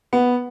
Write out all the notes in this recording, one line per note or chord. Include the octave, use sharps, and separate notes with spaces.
B3